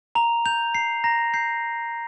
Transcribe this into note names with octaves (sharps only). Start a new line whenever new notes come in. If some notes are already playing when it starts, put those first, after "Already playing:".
A#5 F7
G6 F7
A#5 C7
A#5 A#6
G6 C7